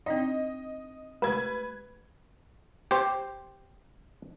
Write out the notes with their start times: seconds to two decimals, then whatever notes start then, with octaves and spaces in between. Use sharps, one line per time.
0.06 C4 D4 D#4 D#5
1.22 G#3 A3 G4 B4 G#6
2.91 G4 C5